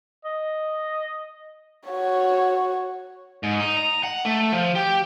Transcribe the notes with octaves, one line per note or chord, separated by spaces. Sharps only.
D#5
F#4 C#5
G#2
D#4
A#5
F#5
A3
F3
G4